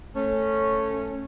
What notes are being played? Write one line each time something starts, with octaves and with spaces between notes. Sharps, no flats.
A3 C#4